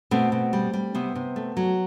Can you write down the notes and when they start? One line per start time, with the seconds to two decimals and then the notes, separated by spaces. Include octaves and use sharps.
0.11 B2 A3 C4
0.32 B2
0.53 G3
0.73 G3
0.95 C3 B3
1.15 C3
1.36 A3
1.57 F#3